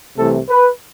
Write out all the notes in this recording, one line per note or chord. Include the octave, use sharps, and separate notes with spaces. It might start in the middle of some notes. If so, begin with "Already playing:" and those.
C2 C3 E3 A3 A4
B4